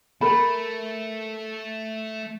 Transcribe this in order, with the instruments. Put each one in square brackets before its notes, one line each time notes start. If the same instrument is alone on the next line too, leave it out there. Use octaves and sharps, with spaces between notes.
[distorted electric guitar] A3 [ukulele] A#4 B5